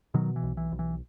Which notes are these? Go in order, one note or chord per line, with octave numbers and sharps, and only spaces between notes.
B2 D#3 F#3
E3
B1
E3
B1
E3